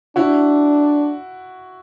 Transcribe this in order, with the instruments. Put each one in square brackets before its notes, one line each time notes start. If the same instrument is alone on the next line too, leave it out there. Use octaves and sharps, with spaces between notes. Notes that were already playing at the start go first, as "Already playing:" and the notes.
[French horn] D4 [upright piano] E4 F#4